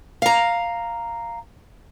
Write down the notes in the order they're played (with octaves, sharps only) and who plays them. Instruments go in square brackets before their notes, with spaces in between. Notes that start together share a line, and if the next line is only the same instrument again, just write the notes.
[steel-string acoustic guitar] F5 A#5